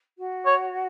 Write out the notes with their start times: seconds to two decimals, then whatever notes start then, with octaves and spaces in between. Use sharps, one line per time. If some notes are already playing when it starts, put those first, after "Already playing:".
0.17 F#4
0.46 C#5